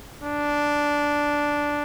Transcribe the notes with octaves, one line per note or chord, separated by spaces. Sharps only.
D4